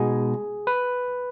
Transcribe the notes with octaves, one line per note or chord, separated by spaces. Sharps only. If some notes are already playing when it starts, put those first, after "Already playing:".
Already playing: B2 G#3 D#4 F#4 G#4
B4